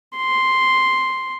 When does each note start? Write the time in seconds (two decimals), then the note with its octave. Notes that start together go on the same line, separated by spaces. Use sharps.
0.17 C6